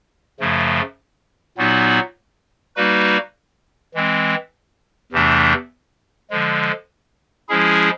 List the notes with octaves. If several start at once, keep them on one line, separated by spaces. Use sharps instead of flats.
F#2 C#3 F3 A3
A#2 F#3 B3 D#4 F#4
G3 A#3 D#4 F#4 B4
E3 G#3 C4
E2 C3 E3 A3 D4
D3 F3 G#3
F3 G#3 C#4 E4 G#4